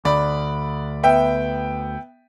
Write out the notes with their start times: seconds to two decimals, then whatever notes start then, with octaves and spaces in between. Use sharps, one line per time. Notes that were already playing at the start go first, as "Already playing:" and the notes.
0.05 D2 D5 B5
1.03 B3 E5 G5